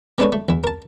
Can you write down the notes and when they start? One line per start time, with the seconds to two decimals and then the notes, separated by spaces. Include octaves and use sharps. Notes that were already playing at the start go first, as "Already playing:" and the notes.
0.18 G#3 B3 D4 A4 B4 C#5
0.32 A3
0.49 E2 E4
0.64 A#4 A5